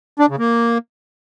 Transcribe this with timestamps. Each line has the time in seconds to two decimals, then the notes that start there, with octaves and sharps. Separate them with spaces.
0.19 D4
0.29 C#3
0.38 A#3